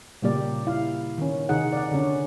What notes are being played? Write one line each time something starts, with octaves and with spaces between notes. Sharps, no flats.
A#2 C#3 G3 A#3 G4 D5
E4 F5
D#3 C#4
C3 D#3 D#4 G#4 F#5
D5 F#5
D3 C#4